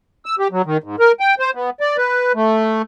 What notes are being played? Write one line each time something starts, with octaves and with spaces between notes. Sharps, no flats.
E6
G4
F#3
D#3
G#2
A#4
G5
C5
B3
D5
B4
A3